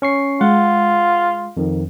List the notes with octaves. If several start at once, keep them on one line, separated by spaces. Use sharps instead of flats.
C#4 C#6 C7
G#3 F4 F#5
F2 D#3